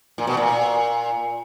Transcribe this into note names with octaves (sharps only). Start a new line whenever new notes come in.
A#2
B2
A#2